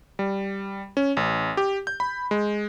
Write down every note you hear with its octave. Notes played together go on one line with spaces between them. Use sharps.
G3
C#4
A1
G4
G6
B5
G#3